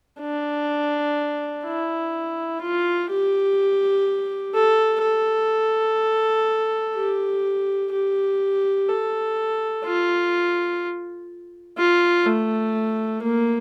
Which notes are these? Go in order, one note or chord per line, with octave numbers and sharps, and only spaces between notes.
D4
E4
F4
G4
A4
A4
G4
G4
A4
F4
F4
A3
A#3